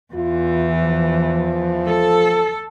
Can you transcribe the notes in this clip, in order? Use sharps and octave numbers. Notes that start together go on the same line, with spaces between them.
E2 E3 F4
F3
A4